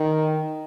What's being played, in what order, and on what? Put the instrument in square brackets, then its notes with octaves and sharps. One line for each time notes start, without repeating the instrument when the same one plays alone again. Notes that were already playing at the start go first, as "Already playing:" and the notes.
Already playing: [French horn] D#3